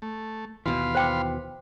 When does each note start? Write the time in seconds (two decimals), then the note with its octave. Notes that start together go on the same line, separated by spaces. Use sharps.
0.02 A3
0.66 D#2 B2 E3 F5 B5 C6
0.95 C5 G5 D6